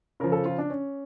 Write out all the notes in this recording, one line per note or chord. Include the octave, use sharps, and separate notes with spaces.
C#3 F3 A#4
A4
F4
D4
C#4